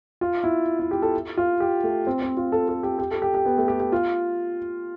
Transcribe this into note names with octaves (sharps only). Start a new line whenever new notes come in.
F4
E4
E4
G4
A4
F4
G4
A3
C4
C4
F4
A4
A4
G4
G4
A4
G4
G4
B3
A3
G4
G4
F4